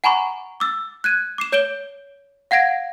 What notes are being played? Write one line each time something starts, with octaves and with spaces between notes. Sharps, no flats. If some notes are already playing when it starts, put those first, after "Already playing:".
F#5 G#5 A#5 B5 C#6 D6
D6 E6 A6
F#6 G#6 D#7
D6 C7 E7
C#5 G6 D7 E7 G7
F5 F#5 G#6 A#6 D7